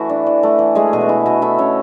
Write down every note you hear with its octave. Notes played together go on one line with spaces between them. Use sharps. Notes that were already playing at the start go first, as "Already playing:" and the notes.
Already playing: E3 A3 E4 F#4
D4
E3
A3
E3
G#3 A3 G#4
B2 G#4
F#4
E4
B2 F#4
A3 E4 E5
B2 C#4 C#5